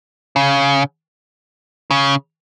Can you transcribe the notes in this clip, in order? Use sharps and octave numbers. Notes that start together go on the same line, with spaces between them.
C#3
C#3